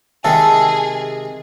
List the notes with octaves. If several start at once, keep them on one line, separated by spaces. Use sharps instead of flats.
C3 D#3 G#3 G#4 A4